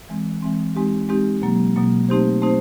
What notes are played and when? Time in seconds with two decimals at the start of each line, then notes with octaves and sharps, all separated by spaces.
0.09 E3 G#3 C4
0.42 E3 G#3 C4
0.75 G#3 C4 D#4 G4
1.09 G#3 C4 D#4 G4
1.42 B2 F#3 A#3
1.76 B2 F#3 A#3
2.08 A3 C4 D#4 G4 C5
2.42 A3 C4 D#4 G4 C5